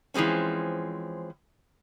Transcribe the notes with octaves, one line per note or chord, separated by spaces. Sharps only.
E3 F3 G#3 C4 C#4